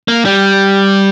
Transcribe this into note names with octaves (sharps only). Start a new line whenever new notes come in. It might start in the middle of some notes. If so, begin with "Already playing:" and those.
A#3
G3